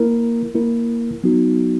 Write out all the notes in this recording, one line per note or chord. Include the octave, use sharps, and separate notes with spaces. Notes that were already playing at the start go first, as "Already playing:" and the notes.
Already playing: A#3 E4 A#4
A#3 E4 A#4
F#3 B3 D#4 F#4